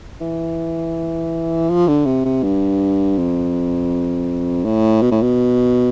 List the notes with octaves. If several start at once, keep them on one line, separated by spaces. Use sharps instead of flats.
E3
F3
D3
C3
C3
G2
F2
A2
B2
A2
B2